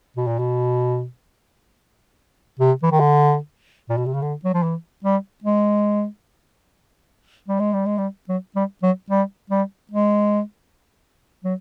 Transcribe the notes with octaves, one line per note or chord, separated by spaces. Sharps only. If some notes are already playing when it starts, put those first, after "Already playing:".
B2
A#2
B2
C3
E3
D#3
D3
A#2
B2
C3
C#3
D3
F#3
F3
E3
G3
G#3
G3
G#3
G3
G#3
G3
F#3
G3
F#3
G3
G3
G#3
F#3